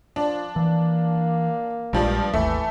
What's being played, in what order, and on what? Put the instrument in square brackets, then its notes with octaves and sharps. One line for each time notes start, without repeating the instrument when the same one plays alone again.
[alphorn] F3 [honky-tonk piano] D4
[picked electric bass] E3 [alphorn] A#3
[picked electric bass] A#1 G#3 [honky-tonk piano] G2 F3 G3
[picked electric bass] G#1 D#2 [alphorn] E3 [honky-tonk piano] A3